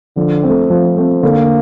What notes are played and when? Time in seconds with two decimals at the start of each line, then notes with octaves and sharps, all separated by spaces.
0.17 D3 F3
0.43 A3 C4
0.70 F3
0.97 A3 C4
1.23 D3 A#3